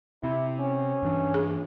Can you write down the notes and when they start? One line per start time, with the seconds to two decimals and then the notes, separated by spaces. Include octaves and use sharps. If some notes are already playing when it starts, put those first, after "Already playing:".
0.23 C3 E4
0.59 C#4
1.03 G2 E3 D4
1.34 G#4